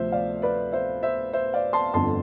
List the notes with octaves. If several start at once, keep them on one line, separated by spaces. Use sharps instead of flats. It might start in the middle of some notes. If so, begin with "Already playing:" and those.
Already playing: D2 C3 F3 C5 E5
D5 F5
B4 D5
C5 E5
C5 E5
C5 E5
D5 F5
A5 C6
G1 F2 D3 A5 C6